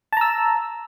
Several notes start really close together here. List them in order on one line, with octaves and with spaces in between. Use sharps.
A5 A#5 E6